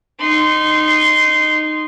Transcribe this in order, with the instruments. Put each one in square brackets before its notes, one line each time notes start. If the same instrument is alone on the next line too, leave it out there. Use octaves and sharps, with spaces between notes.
[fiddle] D#4 C6